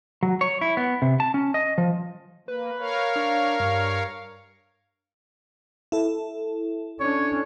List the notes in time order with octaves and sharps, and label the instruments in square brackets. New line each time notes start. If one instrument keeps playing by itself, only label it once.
[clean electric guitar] F#3
C#5
E4
B3
C3
A5
C#4
D#5
F3
[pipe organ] A#3 [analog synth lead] B4
[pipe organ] A#4 C#5 F5
[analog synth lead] D4
G2
[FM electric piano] E4 A4
[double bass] C#4 D4 [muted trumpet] C#5